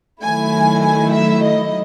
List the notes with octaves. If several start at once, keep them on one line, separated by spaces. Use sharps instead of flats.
D#3 F#3 A3 E4 G#5
G#5
E5
D#5